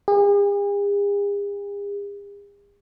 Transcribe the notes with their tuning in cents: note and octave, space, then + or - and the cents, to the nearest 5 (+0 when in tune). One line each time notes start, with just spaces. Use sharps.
G#4 -45